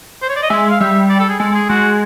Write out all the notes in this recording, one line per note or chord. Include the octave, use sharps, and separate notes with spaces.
C5
C#5
D5
D#5
G#3 E5
F5
G3 E5
D5
A4
G#4
G#3 A4
G#4
G#3 F#4